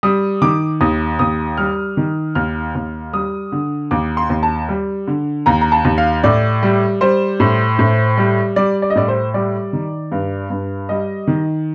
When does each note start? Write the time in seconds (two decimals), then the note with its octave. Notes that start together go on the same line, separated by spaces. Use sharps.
0.03 G3 D#6
0.42 D#3 D6
0.81 D#2 D#6
1.19 D#2 D#6
1.57 G3 F6
1.97 D#3
2.35 D#2 F6
2.75 D#2
3.13 G3 D#6
3.52 D3
3.91 D#2 D6
4.17 C6
4.30 D#2
4.43 A5
4.69 G3
5.07 D3
5.46 D#2 A#5
5.61 A#5
5.72 A5
5.85 D#2
5.98 F5
6.23 A2 D5
6.63 G3
7.01 G3 C5
7.40 A2
7.79 A2
8.17 G3
8.56 G3 D5
8.82 D5
8.90 D#5
8.96 A2 D5
9.08 C5
9.34 G3 D5
9.73 D#3
10.12 G2
10.50 G2
10.89 G3 D#5
11.27 D#3